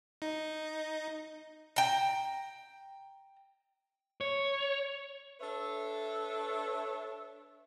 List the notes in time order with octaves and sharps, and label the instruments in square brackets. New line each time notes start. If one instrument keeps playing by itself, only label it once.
[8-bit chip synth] D#4
[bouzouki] G5 A#5
[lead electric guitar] C#5
[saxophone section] D4 A4 B4 C#5 E5